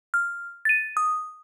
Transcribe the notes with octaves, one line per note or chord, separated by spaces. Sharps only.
F6
A6 D#7
D#6